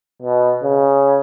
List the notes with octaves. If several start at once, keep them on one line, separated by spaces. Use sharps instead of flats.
B2
C#3